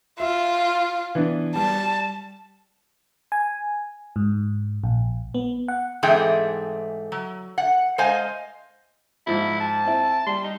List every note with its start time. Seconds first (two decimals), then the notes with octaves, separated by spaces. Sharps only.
0.20 F4 E5
1.15 E3 B3 D4
1.55 G3 A5
3.32 G#5
4.16 G#2
4.84 A#1
5.34 B3
5.68 F#5
6.03 G#2 E3 A3 C4 G#4 G5
7.12 F#3
7.58 F#5
7.98 G#3 C5 D#5 F5 G#5
9.27 G#2 F3 E4
9.60 A5
9.85 C4 E4
10.27 G3 C6
10.44 D#4